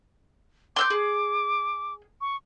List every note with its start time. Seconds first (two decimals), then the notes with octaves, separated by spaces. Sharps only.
0.76 C6 D6 E6 G6
0.90 G#4
2.21 C#6